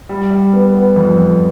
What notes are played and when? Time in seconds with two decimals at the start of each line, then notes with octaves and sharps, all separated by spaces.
0.09 G3
0.31 G3
0.53 B3
0.75 B3
0.96 F2
1.17 F2